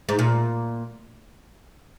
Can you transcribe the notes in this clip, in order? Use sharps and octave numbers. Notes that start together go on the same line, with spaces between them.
G#2
A#2